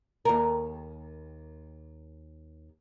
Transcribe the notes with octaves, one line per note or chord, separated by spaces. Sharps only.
D#2 A#4